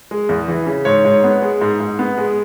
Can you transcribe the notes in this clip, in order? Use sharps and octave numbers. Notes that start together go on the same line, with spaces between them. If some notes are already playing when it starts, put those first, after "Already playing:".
G#3
E2
E3
C#3
G#2 C#5
G#2
B3
G#3
G#2
G#2
B3
G#3